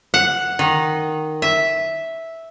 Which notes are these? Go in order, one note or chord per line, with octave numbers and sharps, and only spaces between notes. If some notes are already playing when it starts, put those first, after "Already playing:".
F#5
D#3
E5